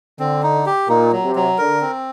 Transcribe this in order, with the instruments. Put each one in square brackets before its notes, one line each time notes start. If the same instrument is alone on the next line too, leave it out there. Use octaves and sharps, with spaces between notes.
[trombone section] D3 [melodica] C4
[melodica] D#4
G4
[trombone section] A#2 [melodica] D#4
[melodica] F#3
[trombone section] C3
[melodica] F#3
[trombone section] D3 [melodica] A#4
[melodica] C4